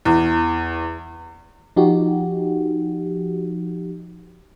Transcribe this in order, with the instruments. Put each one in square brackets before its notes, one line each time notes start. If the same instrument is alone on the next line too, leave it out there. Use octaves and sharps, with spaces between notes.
[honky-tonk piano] E2
[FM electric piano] F3 D#4 F#4 G4